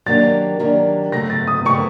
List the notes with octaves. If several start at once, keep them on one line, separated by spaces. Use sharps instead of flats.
D#3 F#3 A#3 D4 G4 A6
D#3 F#3 A#3 D4 G4
C#3 F#3 A3 A#6
A6
D#6
C#3 F#3 A3 C#6